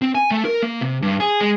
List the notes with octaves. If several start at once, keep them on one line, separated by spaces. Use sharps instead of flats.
C4
G#5
A3
A#4
A#3
C3
G2
G#4
G#3